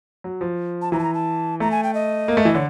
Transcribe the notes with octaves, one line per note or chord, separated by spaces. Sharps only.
F#3
F3
A5
E3 A#5
A5
A#5
A5
A3 A#5
G#5
G5
D#5
A#3
A3
E3
D3 C#5